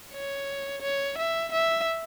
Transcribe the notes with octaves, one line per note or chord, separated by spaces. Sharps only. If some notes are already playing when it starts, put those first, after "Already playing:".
C#5
C#5
E5
E5